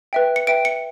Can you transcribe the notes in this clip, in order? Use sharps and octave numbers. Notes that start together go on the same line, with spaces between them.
B4 E5 G5
C#7
B4 E5 G5 D7
C#7